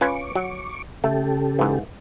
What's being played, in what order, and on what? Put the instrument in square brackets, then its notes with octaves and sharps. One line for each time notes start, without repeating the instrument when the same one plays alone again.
[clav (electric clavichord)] C#4 F4 B4 [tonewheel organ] C#6 D6
[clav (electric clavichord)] F#3
[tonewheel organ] C#3 G4 A4 [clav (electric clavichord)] A3
[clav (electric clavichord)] G#2 E3